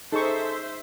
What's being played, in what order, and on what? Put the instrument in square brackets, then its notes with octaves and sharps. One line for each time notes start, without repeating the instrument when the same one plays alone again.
[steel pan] D#4 G#4 C#6 [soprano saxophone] A4 [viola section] C5 E5